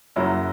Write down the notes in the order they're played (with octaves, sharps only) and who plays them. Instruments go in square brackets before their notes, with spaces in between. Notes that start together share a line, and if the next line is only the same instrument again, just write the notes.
[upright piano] F#1 F#2 F#3 E4